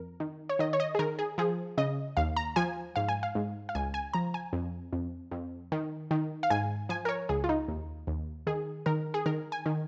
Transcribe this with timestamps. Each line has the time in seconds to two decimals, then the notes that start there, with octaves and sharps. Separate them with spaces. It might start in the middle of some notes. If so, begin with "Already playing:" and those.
Already playing: F2 A#4
0.20 D#3
0.49 C#5
0.59 D#3 D#5
0.73 C#5
0.80 D#5
0.95 G#4
0.99 D#3 A#4
1.19 G#4
1.38 F3 G#4
1.77 C#3 D#5
2.17 D#2 F5
2.36 A#5
2.56 F3 G#5
2.96 G#2 F5
3.08 G#5
3.23 F5
3.35 G#2
3.69 F5
3.75 C#2 G#5
3.94 G#5
4.13 F3 A#5
4.34 G#5
4.53 F2
4.93 F2
5.31 F2
5.72 D#3
6.11 D#3
6.43 F5
6.50 G#2 G#5
6.89 F3 G#5
7.05 A#4
7.09 C#5
7.29 C#2 G#4
7.44 F4
7.49 D#4
7.68 D#2
8.07 D#2
8.47 D#3 G#4
8.86 D#3 A#4
9.14 G#4
9.26 D#3 A#4
9.52 G#5
9.66 D#3